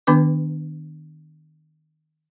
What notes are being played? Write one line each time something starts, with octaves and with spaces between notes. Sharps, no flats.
D#3 B3 D4 B4 D6